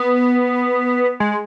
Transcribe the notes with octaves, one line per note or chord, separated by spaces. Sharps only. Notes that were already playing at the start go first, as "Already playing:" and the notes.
Already playing: B3
G#3